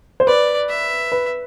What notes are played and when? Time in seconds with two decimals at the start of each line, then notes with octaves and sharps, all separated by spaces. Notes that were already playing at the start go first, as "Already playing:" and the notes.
0.20 C5
0.27 B4 D5
0.69 E5
1.12 B4